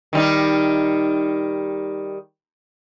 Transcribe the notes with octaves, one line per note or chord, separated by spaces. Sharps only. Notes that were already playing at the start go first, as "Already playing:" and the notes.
D#3 G3 D#4